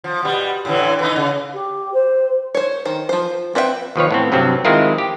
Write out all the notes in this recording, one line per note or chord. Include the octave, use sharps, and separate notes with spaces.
F3
B2 G3
A2 D3 E3
E3 A3 D#4
C#3
G4
C5
C5 C#5
D#3 C5
F3 C5
C4 B4 E5 F5 G5
D#2 F3 B4 C#5
A2 B3 C4
G2 C3 F#3 C4
D#3 G#3 C4 E4 F4 A#4
G4